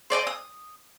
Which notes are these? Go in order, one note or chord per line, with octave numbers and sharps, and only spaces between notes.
C5 D5 D#5 D6
D#6